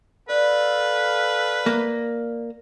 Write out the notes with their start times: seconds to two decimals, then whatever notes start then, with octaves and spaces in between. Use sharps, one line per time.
0.29 A4 B4 D5 F5
1.66 A#3